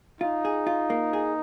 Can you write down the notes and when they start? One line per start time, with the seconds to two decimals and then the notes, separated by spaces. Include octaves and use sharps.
0.21 D#4 F4
0.45 G#4
0.67 F4
0.90 A#3
1.13 G#4